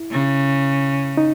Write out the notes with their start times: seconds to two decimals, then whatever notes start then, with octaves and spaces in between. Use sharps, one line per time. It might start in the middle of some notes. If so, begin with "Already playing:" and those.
Already playing: E4
0.11 C#3
1.17 D#4